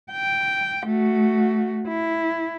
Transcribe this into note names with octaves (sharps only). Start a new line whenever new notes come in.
G5
A3 F#4
E4